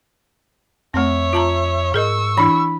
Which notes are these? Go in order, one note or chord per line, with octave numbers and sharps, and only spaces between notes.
F2 A3 C4 C#5 E5
F4 A5 A#5
G#2 G#4 A#4 D#5 C#6 E6
E3 D4 E4 B5